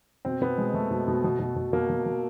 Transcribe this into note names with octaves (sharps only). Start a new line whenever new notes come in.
B2 C4
B2 B3
B2 G#3
B2 A3
B2
B2
B2
B2
B2
B2 A#3
B2
B2